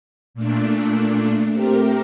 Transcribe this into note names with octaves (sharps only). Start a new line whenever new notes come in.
A#2 A3 D4
A3 C4 G4 A#4